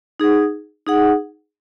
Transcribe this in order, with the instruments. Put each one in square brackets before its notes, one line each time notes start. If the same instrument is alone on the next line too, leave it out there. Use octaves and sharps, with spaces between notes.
[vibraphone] D#4 G#4 F#5
D#4 G#4 F#5